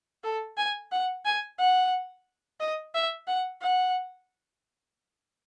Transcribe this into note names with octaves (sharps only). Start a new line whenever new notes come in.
A4
G#5
F#5
G#5
F#5
D#5
E5
F#5
F#5